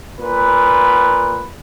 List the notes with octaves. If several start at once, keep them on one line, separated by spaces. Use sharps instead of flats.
A#2 B4